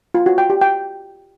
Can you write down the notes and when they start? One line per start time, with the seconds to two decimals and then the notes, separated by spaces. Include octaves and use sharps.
0.14 F4
0.26 F#4
0.38 G5
0.50 G4
0.61 G5